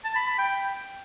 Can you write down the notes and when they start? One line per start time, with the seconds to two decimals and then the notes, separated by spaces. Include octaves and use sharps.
0.04 A5
0.16 B5
0.27 B5
0.38 G5